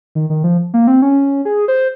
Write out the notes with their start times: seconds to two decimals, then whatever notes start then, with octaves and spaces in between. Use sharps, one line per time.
0.15 D#3
0.30 D#3
0.44 F3
0.74 A#3
0.87 C4
1.02 C#4
1.45 G#4
1.68 C5